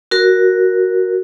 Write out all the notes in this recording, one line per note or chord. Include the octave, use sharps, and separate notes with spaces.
F#4 A#4